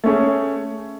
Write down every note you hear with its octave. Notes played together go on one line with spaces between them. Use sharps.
A3 C#4 G#4 C#5